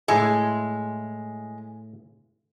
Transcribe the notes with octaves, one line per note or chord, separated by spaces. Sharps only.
A2 G#3 E4 A4